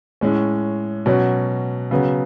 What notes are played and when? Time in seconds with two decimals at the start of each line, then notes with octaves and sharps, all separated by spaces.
0.21 A2 G#3 C#4
1.06 B2 F#3 C#4
1.91 C#3 F#3 B3